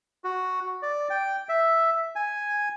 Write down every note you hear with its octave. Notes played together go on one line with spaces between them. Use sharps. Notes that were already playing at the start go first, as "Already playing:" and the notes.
F#4
D5
G5
E5
G#5